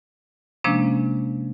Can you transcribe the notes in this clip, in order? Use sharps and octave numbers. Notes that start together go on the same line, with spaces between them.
C3 F3 G#3 A#3 C#4 D4